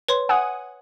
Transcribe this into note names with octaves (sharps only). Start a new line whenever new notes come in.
B4 C#5 C6
F#5 G#5 D#6